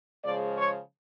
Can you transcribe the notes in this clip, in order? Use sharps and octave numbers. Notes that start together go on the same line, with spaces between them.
C#3 F3 G#3 D5
C#5